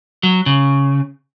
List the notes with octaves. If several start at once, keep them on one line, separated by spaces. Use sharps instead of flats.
F#3
C#3